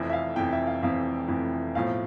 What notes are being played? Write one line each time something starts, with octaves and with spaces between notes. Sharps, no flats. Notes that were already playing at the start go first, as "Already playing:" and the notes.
Already playing: F1 F2 E3
E5
F5
F1 F2 E3 G5
E5
F5
F1 F2 E3 F5
F1 F2 E3
B1 A2 F3 F5